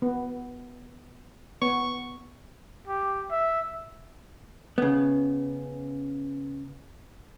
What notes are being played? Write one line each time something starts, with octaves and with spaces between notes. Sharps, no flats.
B3
B3 C#6
G4
E5
C#3 B3